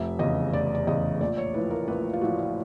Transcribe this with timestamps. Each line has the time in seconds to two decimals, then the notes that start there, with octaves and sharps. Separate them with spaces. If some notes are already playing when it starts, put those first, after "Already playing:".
Already playing: F1 E5
0.19 E2 C#3 D#5
0.53 F1 D5
0.75 D5
0.87 E2 C#3 D#5
1.21 A#1 D5
1.38 C#5
1.54 A2 F3 B4
1.71 A#4
1.88 A#1 B4
2.13 F4
2.21 A2 F3 F#4
2.39 F4